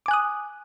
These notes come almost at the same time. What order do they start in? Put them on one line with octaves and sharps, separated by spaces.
D6 G#5 F#6 D#6